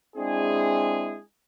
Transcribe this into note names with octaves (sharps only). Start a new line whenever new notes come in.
G#3 C4 D4 E4 G#4